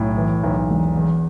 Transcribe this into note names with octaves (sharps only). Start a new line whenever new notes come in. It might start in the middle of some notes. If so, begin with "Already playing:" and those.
Already playing: B1 A2
E3
B1
E1
E2